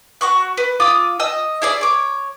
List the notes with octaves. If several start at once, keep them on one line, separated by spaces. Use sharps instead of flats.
F#4 C#6 F#6
B4
F4 D6 D#6
D#5 D#6 E6
E4 G#4 D5
C#5 D6